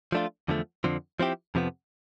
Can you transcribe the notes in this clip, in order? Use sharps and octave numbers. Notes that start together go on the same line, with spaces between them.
F3 A3 D4 F4
E2 D3 F3 A3
F2 D3 F3 C4
F3 C4 E4 G4
F2 C3 F3 B3